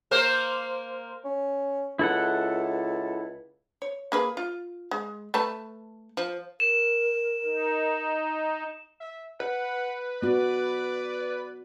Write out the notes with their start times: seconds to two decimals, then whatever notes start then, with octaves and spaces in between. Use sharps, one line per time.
0.11 A#3 A#4 C5
1.25 C#4
1.99 C#2 E4 A4 F#5
3.82 C#5
4.12 A#3 G#4 B4
4.37 F4
4.91 G#3
5.34 A3 B4 A5
6.17 F3
6.60 A#4 E7
7.44 D#4
9.01 E5
9.40 B4 F#5
10.22 B3 F#4 D5